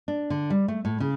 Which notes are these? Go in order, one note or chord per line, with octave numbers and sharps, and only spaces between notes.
D4
D3
G3
A3
A2
C#3